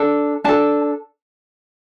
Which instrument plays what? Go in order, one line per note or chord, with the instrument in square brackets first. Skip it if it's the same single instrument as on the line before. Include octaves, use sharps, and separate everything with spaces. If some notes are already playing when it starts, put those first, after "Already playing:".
Already playing: [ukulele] D4 A4
D4 A4 A5